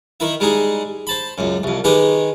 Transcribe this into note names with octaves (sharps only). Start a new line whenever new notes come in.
D#3 E4 E5
G3 G#3 D#4 G#4
C5 A5 B5
C#2 F#2
C2 F2
D#3 G#3 G4 B4